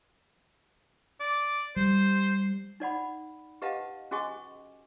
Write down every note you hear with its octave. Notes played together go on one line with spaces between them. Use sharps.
D5
G3 C5
D#4 D5 F#5 B5
G4 B4 D#5 F5 F#5 A5
C#4 F#4 G#4 D#5 G#5 C#6